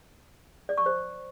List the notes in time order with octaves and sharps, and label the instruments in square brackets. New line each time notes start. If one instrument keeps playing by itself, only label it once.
[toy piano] D5
C#6
C5